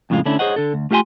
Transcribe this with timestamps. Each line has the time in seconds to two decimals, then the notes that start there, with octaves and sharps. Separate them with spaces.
0.10 F2 A2 C#3 G#3 F4
0.26 D3 A3 C#4 D4 E4
0.39 G#4 C5 C#5 D#5 F#5
0.56 D3 A4
0.74 D2
0.91 A3 F4 G4 F5 G#5 C6